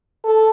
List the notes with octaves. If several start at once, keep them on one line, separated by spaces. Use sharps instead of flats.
A4